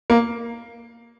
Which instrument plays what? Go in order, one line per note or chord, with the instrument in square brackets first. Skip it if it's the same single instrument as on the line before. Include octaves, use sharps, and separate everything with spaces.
[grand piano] A#3